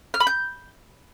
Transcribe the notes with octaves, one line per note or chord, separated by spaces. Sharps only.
F6
B5
G6